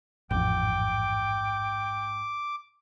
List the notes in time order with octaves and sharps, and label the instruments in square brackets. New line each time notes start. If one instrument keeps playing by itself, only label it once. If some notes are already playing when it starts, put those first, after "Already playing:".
[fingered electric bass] A1 F2 [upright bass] G#2 [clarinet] G5 [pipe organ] D6